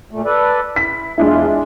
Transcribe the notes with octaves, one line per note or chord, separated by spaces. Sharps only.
A#2 A3
A4 B4 D5
E4 B6
E2 G#3 D4 E4 F4